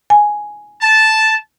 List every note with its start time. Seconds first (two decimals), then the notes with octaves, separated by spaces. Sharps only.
0.10 G#5
0.81 A5